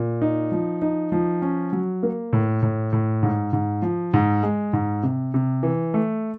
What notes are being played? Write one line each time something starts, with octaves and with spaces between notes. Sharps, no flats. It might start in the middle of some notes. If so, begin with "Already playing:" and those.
Already playing: A#2
D#4
F3
D#4
F3
C#4
F#3
A#3
A2
A2
A2
G#2
G#2
F3
G#2
G#3
G#2
C3
C3
E3
A3